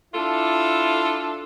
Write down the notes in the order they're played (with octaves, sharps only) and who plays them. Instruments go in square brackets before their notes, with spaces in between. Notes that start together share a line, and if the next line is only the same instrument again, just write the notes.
[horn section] D4 E4 F4 A4